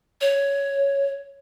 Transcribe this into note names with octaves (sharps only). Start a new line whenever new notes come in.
C#5